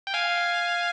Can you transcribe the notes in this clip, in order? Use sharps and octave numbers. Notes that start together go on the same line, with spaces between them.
G5
F5 G#5